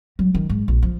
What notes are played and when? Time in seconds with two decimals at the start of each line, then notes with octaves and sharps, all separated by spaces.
0.19 F#3
0.34 D#3
0.49 G#2
0.68 A#1
0.83 F3